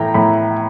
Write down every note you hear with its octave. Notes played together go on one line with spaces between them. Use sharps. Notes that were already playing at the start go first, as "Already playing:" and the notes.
Already playing: A2 E3 A3 G5 A#5
A2 B5